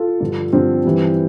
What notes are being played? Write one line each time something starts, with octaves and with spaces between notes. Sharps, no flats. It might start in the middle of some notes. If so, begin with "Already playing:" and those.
Already playing: F4 A4
G2 D3 F3
G2 D3 F3 C4
G2 E3 G3